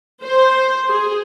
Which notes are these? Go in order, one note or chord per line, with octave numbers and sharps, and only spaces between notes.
C5
G#4